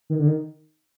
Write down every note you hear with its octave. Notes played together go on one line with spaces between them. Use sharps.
D#3
D3
D#3